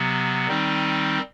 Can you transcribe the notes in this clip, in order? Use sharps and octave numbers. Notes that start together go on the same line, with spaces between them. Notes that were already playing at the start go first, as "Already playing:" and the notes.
Already playing: C3 F#3 B3
D#3 G3 C4 D#4